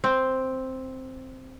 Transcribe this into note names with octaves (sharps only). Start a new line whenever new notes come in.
C4